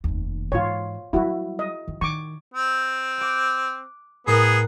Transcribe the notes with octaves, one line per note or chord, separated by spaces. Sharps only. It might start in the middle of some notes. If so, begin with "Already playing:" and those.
F1 D#2
G#2 E3 F4 C#5
F#3 G3 E4 F#4
D#5
D#3
D#3 C#6 D6
C4
D6 F#6
A2 B3 G#4 A#4 F#6